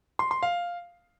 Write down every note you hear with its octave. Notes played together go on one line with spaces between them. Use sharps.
C6
C6
F5